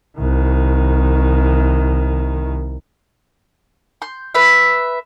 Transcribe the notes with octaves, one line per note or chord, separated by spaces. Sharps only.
C2 D#3
C6 G6
B4 E5